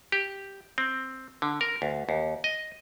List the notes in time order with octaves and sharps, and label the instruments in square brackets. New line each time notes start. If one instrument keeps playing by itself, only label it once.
[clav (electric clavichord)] G4
C4
D3
A#4
D2
D#2
D#5